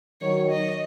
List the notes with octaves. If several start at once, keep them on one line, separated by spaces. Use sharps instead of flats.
D#3 F#3 C#5
D#5